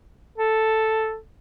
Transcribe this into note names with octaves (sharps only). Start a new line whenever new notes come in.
A4